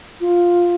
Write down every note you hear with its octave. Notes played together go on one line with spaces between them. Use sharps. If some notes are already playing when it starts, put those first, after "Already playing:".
F4